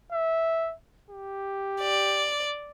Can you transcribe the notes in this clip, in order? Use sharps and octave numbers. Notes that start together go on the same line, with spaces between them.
E5
G4
D5